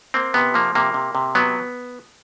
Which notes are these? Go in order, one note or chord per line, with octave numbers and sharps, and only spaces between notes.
A#3 C4
C3 B3
F3 A#3
C3 A#3
C3
C3
F#3 B3